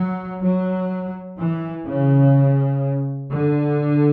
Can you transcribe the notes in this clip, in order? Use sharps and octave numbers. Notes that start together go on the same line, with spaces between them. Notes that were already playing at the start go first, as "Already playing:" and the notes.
Already playing: F#3
F#3
E3
C#3
D3